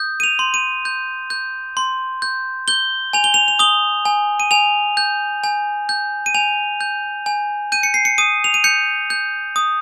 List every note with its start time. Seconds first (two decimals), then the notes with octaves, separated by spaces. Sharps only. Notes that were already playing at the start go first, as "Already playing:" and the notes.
Already playing: D#6 G6
0.20 D#7
0.23 F7
0.39 C6
0.54 D#7
0.85 G6
1.30 G6
1.77 C6
2.22 G6
2.68 G6 G7
3.13 G#5 F7
3.24 G7
3.34 F7
3.48 F7
3.59 D#6 G7
4.05 G#5
4.40 D#7
4.51 G#5 F7
4.97 G6
5.44 G#5
5.89 G6
6.26 D#7
6.34 G#5 F7
6.81 G6
7.26 G#5
7.72 G6 D#7
7.83 C#7
7.94 C7
8.05 C#7
8.18 D#6 D#7
8.44 F7
8.54 D#7
8.64 G6 C#7
9.10 G6
9.56 D#6